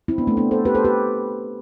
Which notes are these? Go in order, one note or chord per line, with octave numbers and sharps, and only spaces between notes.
C4 E4
B3 D4
A3 C4
B3 D4
A4 C5
G4 B4
A4 C5
G4 B4